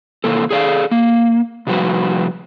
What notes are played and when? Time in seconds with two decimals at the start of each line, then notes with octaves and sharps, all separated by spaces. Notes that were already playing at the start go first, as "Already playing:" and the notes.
0.24 C3 E3 A#3 A4
0.51 G#4 A4 D5 E5 F5
0.91 A#3
1.67 C3 F3 G3 F#4 B4